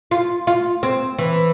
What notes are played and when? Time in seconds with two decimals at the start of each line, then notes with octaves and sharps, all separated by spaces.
0.11 F4
0.47 F4
0.83 C4
1.18 E3